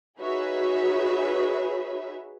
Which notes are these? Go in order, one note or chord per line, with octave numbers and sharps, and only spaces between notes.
D#4 F#4 G#4 B4 C#5 E5